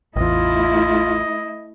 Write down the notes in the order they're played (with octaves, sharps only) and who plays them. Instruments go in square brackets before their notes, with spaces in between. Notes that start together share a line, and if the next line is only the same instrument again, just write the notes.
[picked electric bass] A1 E2 [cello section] A3 E4 [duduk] F4 [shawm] D#5